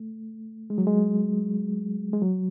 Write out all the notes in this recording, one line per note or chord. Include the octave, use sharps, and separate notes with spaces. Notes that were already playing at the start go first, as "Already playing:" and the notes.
Already playing: A3
G#3
F#3
G#3
G#3
F#3